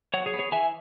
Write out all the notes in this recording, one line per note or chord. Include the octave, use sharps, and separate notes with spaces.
F#3 C#5 F#5
G#4 C#5
B3
G#4 C#5
E3 E5 G#5